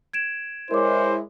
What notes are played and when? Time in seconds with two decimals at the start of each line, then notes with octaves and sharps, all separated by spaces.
0.13 G#6 D7 E7
0.71 G#3 E4 A#4 C5 C#5 D6